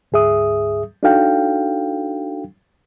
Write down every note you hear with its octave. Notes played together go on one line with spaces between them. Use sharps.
D2 G#2 G#4 E5 D#6
D4 D#4 F#4 A4 F5 G5